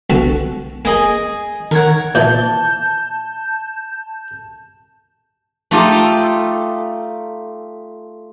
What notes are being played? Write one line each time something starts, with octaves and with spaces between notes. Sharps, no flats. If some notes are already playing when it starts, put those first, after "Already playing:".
B1 D3 F#4
A#3 G#4 D#5 G#5
D#3 A#4 C#5 F#5 G#6
A#2 E3 A5 G6
A3 D#4 F4 G4 A4